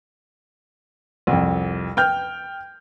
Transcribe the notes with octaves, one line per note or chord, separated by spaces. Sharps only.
C2 F2
G5 F6 G6